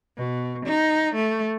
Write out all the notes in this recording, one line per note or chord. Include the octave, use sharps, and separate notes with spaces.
B2
D#4
A3